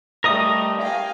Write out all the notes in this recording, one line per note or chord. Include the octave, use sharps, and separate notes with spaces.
G3 A3 A#4 D#5 D#6
F5 G5 G#5